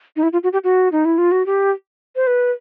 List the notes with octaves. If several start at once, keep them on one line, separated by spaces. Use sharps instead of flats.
D#4
E4
F4
F#4
G4
F#4
D#4
E4
F4
F#4
G4
C5
B4